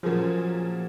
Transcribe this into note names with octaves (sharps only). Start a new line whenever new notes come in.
A#2 F3 F#3 A#3 C#4 G#4